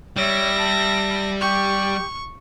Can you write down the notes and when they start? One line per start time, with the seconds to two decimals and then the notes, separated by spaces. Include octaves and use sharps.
0.17 G3 C#5 E5 A#6
0.58 A5
1.41 G4 C#6